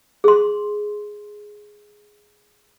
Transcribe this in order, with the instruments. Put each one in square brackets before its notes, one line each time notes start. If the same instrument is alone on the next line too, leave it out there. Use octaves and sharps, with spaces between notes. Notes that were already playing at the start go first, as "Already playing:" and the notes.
[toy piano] G#4 C6